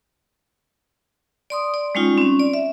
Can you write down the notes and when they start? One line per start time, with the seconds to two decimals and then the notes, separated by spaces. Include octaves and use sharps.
1.50 D5 C6 D#6
1.74 D5
1.95 G3 G#3 C#4 D#4 F4
2.18 C4 C#4
2.40 D5
2.54 E5